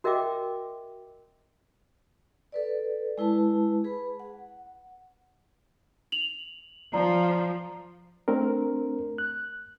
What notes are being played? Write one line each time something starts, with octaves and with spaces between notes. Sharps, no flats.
F#4 A#4 D#5 E5 G5 D6
A4 B4 D5
G#3 E4 B4 A5
G#4 B4 B5
F#5
F7 F#7
F3 D5 A#5
A3 C4 D4 A#4
F#6